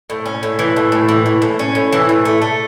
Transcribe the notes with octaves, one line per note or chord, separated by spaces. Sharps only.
A2
C#4
A2
E3
A2
A2
E3
A2
A2
C#4
A2
E3
A2
A3
A3